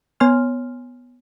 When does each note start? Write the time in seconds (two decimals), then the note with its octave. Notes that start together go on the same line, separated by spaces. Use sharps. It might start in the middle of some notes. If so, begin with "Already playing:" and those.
0.20 B3 C#5 G#5 C6 F6